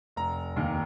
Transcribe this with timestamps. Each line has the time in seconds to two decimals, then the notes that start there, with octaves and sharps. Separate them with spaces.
0.16 F1 A#5
0.56 D#2 D#3 A#3